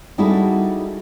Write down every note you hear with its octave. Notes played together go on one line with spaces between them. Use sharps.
G3 D#4 E4 F#4 G#4 A4